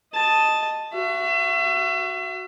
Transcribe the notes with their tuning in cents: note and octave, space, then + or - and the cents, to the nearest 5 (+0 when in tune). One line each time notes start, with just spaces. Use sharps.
D#5 +0 A5 +0
F#4 +0 E5 +35